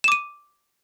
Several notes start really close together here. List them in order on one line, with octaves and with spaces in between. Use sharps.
E7 D6 D#7